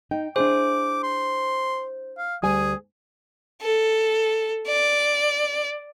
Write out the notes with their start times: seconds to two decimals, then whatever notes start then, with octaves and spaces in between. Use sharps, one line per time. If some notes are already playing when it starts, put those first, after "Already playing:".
0.11 D#4 G5
0.36 D4 E4 G#4 C5 D6
1.03 C6
2.18 F5
2.43 D2 G3 G#4 G#5
3.62 A4
4.68 D5